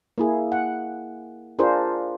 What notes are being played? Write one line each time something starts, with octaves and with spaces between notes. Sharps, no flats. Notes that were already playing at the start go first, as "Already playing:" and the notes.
A#3 E4 G#4
F#5
D4 F4 G#4 A#4 C5